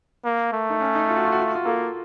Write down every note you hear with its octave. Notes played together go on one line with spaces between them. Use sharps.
A#3
A3
D#4
C#4
D#4
F4
F#4
F4
F#4
F4
F#4
F4
A#3 A4